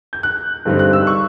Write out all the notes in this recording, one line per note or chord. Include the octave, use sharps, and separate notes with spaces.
G6
F#6
G2 D3 G3 C4 D#4
F#6
E6
C#6